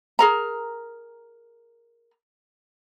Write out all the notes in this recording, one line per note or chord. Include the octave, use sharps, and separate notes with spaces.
G#4 A#4 A#5